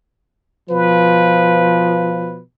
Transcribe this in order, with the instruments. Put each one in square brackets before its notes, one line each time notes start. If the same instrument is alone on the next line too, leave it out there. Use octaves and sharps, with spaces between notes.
[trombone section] B2 F3 [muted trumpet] B4